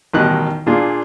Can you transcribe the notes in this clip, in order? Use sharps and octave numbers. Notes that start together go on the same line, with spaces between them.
A1 B2 D#3 G3 D#5 F#6
A#2 D4 F4 G#4